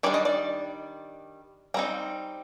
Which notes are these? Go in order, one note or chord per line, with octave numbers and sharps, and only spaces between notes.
D#3 G3 D4 D5
D#5
D5
G3 C4 D#4 A#5